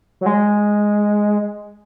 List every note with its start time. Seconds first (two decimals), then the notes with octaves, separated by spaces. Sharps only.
0.21 F#3
0.26 G#3